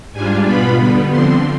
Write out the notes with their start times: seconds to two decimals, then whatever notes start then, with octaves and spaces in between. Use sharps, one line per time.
0.12 G#2 G3 D4 F4 G#5
0.45 B2 B3 F4 B5
0.78 D3 G3 B3
1.11 D3 F3 C4 C6